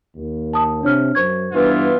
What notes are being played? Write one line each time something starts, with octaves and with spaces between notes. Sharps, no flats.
D#2
A5 D#6
C3 D4 C#5 F6
F#2 C5 C#6 G#6
G2 E3 B3 F4